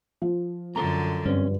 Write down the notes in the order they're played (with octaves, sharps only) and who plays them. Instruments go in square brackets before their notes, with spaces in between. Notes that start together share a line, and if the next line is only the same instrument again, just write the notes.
[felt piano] F3
[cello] F#2 D3 [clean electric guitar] A4 A#5
[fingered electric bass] G2 [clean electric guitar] C4 C#4